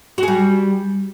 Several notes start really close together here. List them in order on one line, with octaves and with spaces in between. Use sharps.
F#4 G#4 G3